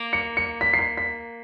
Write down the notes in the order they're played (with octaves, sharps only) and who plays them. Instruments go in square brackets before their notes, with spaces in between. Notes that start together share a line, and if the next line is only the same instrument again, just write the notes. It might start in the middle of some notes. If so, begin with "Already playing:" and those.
Already playing: [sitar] A#3
[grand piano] C#7
C#7
B6
C7
B6
B6